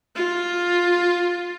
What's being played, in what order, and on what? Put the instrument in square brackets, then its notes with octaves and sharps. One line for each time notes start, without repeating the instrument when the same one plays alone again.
[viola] F4